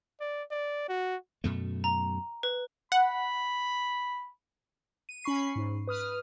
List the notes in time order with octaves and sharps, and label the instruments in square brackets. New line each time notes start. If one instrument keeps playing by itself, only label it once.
[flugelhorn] D5
D5
F#4
[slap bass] F#2 B2 A3
[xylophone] A#5
B4
[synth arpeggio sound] F#5 [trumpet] B5
[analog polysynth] D#7
C#4 B5 C#6 C7
G#2
B4 D#6 F6